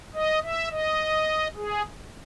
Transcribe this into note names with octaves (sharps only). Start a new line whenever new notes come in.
D#5
E5
D#5
G#4